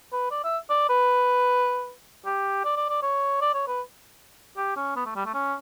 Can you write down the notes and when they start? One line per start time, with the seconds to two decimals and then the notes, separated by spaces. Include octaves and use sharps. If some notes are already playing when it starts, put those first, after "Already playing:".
0.13 B4
0.31 D5
0.44 E5
0.70 D5
0.89 B4
2.26 G4
2.65 D5
2.77 D5
2.89 D5
3.03 C#5
3.41 D5
3.54 C#5
3.68 B4
4.57 G4
4.77 C#4
4.96 B3
5.06 A3
5.16 G3
5.26 A3
5.34 C#4